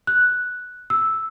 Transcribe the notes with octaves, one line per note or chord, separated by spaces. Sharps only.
F#6
E6